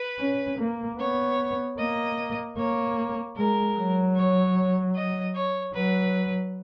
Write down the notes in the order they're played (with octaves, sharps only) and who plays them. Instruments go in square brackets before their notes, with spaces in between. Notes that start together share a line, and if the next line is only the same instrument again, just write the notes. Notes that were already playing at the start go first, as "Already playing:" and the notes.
Already playing: [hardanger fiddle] B4
[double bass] C#4
A#3
[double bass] B3 [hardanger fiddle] C#5
[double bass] A#3 [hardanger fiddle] D#5
[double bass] A#3 [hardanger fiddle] C#5
[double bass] G#3 [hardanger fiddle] A#4
[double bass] F#3
[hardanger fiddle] C#5
D#5
C#5
[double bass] F#3 [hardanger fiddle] B4